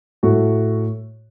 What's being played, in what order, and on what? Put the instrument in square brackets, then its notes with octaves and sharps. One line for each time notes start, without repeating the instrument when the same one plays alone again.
[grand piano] A2 A3 F#4